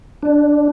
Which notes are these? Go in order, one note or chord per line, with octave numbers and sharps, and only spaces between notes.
D4